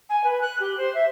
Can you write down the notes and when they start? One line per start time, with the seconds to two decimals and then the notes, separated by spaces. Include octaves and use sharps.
0.09 G#5
0.24 B4
0.41 F#6
0.60 G4
0.77 C5
0.94 E5